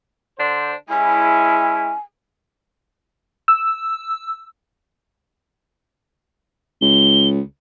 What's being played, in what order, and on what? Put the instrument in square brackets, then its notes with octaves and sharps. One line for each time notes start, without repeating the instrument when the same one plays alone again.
[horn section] D3 D4 C5
[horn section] G#3 C#4 E4 [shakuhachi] G#5
[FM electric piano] E6
[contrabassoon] C#2 [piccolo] G7